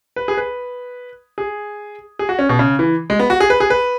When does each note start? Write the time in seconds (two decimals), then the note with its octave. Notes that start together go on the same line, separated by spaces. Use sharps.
0.16 B4
0.28 G#4
0.37 B4
1.38 G#4
2.19 G#4
2.29 F#4
2.39 C#4
2.49 B2
2.59 C#3
2.79 E3
3.10 G#3
3.19 B3
3.30 F#4
3.40 G#4
3.50 B4
3.60 G#4
3.70 B4